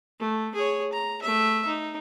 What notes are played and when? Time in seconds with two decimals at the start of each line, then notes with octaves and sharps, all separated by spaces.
0.20 A3
0.55 G#4 C#5
0.93 A#5
1.22 A3 E5
1.67 D#4